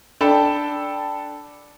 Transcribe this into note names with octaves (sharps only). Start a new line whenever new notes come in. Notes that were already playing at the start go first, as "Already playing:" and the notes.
D4 A4 G5 A5 B5